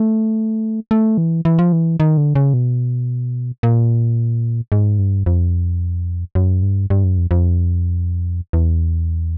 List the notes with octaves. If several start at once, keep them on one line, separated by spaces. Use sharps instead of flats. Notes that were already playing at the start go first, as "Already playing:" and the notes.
Already playing: A3
A3
E3
E3
F3
E3
D#3
D3
C#3
B2
A#2
G#2
G2
F2
F#2
G2
G2
F#2
F2
F2
E2